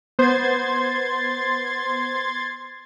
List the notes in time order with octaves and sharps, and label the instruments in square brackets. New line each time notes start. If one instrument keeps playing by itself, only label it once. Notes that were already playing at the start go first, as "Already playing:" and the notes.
[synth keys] B3 C5 [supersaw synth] C6 G#6 A6